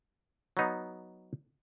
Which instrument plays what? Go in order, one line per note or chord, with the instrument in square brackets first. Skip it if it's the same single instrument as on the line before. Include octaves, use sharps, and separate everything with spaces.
[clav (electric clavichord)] F#3 B3 D#4